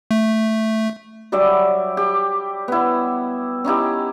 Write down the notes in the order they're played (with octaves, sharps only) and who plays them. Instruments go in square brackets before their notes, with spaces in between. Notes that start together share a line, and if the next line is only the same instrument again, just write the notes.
[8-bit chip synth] A3
[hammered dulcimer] F#3 G3 D5 E5
G4
B3 E4
C#4 D#4 E4 G4